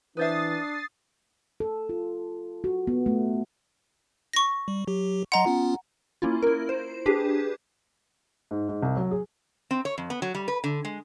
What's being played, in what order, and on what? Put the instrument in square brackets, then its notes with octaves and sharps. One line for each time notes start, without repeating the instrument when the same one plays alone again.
[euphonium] E3 [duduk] D4 [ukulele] B4 C5 E5 [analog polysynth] D#6 A6 C7
[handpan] A4
F4
F#4
B3
A3
[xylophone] C#6 A#6
[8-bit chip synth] G3
F#3 G4
[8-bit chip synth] F#3 D#5 C6 [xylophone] F#5 A#5
[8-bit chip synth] B3 C#4 F4
[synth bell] A#3 C#4 E4 F4
E4 A#4
C5
D4 G4 G#4 B4
[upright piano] G#2
G#2
C2
F#3
G#4
[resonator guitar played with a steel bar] C4
C#5
F2
B3
F#3
G3
B4
D3
G#3